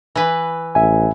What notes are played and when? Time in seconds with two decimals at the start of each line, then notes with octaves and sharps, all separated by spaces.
0.16 E3 B4
0.75 A1 E5 G#5